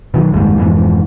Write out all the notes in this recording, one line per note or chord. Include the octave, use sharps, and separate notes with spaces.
B2 D#3 F#3
F#1 D#2 G#2 G3
F2 G#2 B2 E3